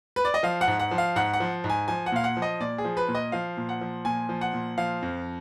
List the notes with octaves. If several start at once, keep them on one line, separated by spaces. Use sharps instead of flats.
B4
D5
D#5
F3 F5
F#5
G#2
F#5
F3
F5
G#2 F#5
F#5
F3
G#2
G#5
F3 G#5
F#5
A#2 F5
F#5
F3
D#5
A#2 D5
G#4
F3
B4
A#2
D#5
F3 F5
A#2
F#5
F3
A#2 G#5
F3
F#5
A#2
F3 F5
F2